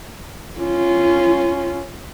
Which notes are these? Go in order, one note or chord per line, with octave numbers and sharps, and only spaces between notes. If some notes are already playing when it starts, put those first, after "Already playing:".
C#4 F4